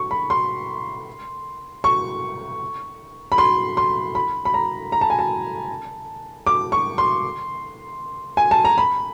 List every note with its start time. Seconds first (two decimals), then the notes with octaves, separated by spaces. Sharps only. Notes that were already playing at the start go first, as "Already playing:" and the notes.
Already playing: C#6
0.11 B5
0.30 C6
1.84 C#6
3.32 B5
3.38 C6
3.77 C6
4.15 B5
4.45 B5
4.54 A#5
4.92 A#5
5.01 A5
5.10 G#5
5.19 A5
6.47 D6
6.72 C#6
6.98 C6
8.37 G#5
8.51 A5
8.65 A#5
8.78 B5